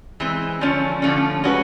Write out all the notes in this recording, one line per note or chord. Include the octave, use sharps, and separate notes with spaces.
E3 G#3 C4
D3 F3 A3 C#4
D3 F3 A3 C#4
G#3 C#4 F#4 B4